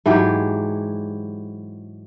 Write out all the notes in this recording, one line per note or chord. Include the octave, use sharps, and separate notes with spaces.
G#2 E3 F#3 G4